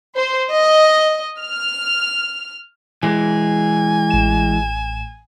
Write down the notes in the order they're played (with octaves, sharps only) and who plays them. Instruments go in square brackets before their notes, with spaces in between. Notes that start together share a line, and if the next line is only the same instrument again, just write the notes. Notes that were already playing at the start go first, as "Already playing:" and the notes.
[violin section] C5
D#5
F6
[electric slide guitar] E3 G#3 [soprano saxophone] G#5
[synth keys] A1 E7